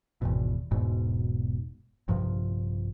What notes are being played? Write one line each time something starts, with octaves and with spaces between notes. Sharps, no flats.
G#1 E2 B2
E1 G#2 B2
A#1 G2 C3 F3